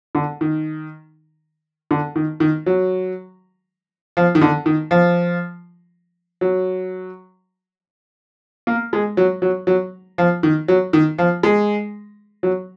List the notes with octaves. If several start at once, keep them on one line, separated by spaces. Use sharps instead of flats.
D3
D#3
D3
D#3
D#3
F#3
F3
D#3
D3
D#3
F3
F#3
A#3
G#3
F#3
F#3
F#3
F3
D#3
F#3
D#3
F3
G#3
F#3